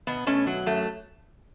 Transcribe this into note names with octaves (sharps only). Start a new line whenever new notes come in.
B2 B3
B2 A3 C#4
F#3
F#2 A3